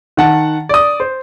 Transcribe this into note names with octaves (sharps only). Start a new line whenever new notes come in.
D#3 F#5 A5
D5 D#6
C5